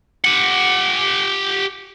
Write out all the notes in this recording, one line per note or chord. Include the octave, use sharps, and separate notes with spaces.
G4 F#5